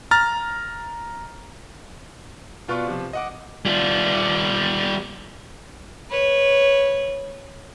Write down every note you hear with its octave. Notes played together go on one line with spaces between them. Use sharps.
A#5 F6 A6
B2 F4 B4 D5 C#6
C3 F3
D#5 F#5 D6
G3 F4
B4 C#5